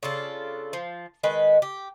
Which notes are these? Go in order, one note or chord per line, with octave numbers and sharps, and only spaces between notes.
C#3 D4 F4 A4
F3
D#3 G#3 B4
G4